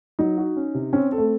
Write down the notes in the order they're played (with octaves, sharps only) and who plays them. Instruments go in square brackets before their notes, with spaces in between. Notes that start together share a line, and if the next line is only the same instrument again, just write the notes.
[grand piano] F#3 [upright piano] D#4
[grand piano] F#4
C#4
C3
[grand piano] C4 [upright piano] C#4
[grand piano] A4
[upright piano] A3